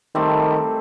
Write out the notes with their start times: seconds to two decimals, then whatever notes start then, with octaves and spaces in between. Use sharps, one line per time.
0.15 D#3 G3 A3 C4